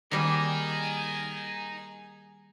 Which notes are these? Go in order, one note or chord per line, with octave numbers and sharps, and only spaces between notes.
D#3 G3 A#3 G#4 A#4 D#5 G#5